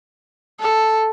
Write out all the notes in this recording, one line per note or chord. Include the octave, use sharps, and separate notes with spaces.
A4